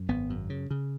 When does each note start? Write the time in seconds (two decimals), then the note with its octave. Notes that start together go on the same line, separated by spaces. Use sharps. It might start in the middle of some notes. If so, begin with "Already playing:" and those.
Already playing: F#2
0.08 G#1 B3
0.30 F#2
0.50 C#3
0.71 C#3